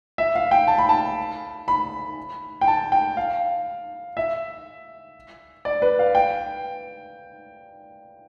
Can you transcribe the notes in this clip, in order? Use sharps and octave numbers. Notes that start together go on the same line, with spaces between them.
E5
F5
G5
A5
B5
A5
B5
G5
A5
G5
F5
E5
D5
B4
F5
G5